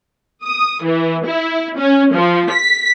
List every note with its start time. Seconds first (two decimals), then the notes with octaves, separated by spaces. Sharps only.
0.44 D#6
0.84 E3
1.27 E4
1.78 C#4
2.14 F3
2.51 B6